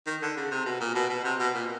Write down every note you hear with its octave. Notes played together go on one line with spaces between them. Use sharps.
D#3
D3
C#3
C3
B2
A#2
B2
B2
C3
B2
A#2